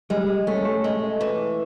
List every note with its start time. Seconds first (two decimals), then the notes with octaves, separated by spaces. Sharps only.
0.10 G3 G#3
0.47 A3 C#4
0.65 A3
0.84 G#3
1.21 E3